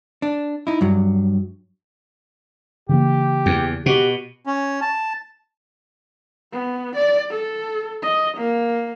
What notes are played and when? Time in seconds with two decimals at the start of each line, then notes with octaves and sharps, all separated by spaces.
0.22 D4
0.67 D#4 E4
0.81 G2 F#3
2.89 C#3 E3 A#3 G4
3.46 E2
3.86 B2 F#4 G4
4.46 C#4
4.81 A5
6.52 B3
6.96 D5
7.31 A4
8.02 D#5
8.38 A#3